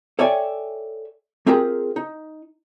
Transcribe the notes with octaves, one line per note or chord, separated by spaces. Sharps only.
A4 C#5 D5 E5 G5 G#5
A#3 C4 F4 G4 G#4 A#4
D#4